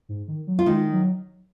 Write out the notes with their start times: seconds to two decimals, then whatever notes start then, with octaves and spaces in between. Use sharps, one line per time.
0.09 G#2
0.28 D#3
0.47 F#3
0.59 F4
0.66 D#3 G#3 D#4
0.92 F#3